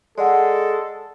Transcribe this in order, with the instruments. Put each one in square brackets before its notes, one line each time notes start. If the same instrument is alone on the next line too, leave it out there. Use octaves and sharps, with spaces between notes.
[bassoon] G#3 [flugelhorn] A4 [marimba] D5 F#5